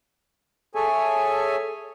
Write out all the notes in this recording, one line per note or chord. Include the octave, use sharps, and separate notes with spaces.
G#4 A4 C#5 E5 G#5